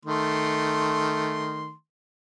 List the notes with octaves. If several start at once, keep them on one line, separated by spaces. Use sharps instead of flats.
D#3 A3 C6